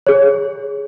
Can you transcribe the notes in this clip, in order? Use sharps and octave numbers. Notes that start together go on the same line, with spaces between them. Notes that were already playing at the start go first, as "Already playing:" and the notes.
G#4 C#5